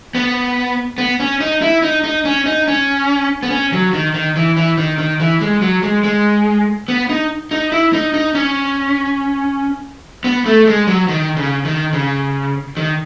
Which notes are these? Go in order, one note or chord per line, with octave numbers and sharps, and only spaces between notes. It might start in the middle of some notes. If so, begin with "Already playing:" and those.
B3
B3
C#4
D#4
E4
D#4
D#4
C#4
D#4
C#4
B3
C#4
F#3
D#3
D#3
E3
E3
D#3
D#3
E3
G#3
F#3
G#3
G#3
B3
D#4
D#4
E4
D#4
D#4
C#4
B3
A3
G#3
F#3
D#3
C#3
D#3
C#3
D#3